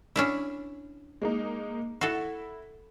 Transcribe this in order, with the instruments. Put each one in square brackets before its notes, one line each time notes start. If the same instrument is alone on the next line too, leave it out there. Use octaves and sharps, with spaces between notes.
[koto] C#4 D4 E4
[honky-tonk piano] G#3 A#3 D#4
[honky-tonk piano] E4 [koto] F#4 A4